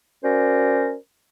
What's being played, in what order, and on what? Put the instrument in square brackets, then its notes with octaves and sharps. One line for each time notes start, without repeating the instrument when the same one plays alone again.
[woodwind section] C#4 F#4 A#4 C5 D5